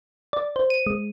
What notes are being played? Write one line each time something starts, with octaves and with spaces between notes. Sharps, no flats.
D5
C5
D#7
G#3